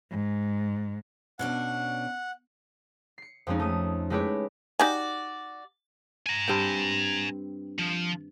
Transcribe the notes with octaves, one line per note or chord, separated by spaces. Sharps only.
G#2
B2 C#4 D4 F#5
C7 C#7
F2 F3 G#3 C4 C#4 D#4
A3 D#6
G#3 A3 E4 G4 B4 C#5
D#4 F#4 G4 D5 G#5
G#5 A#5
G2 C4 G5
F3